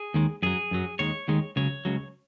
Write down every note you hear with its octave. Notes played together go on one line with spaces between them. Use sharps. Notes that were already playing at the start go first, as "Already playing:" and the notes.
Already playing: G#4
D#2 D#3 G#3
F#2 F#3 G#4
F#2 F#3
D#2 D#3 G#3 C#5
D#2 D#3 G#3
C#2 C#3 F#3 C#5
C#2 C#3 F#3